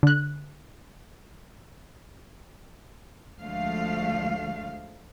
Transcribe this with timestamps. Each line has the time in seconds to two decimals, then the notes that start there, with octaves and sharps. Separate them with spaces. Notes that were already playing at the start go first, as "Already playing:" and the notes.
0.03 D3 F#6
3.40 D2 D3 F3 G#3 A3 F5